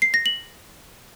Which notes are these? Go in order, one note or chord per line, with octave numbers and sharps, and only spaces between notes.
C7
A#6
F#7